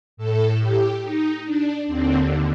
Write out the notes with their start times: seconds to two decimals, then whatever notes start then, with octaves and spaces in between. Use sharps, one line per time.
0.17 A2 A4
0.59 G4
1.02 D#4
1.45 D4
1.87 D#2 D3 C4